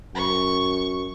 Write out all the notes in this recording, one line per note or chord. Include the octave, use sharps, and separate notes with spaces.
F#2 C#6